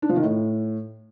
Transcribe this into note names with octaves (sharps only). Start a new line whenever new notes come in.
D4
F3
D#3
A2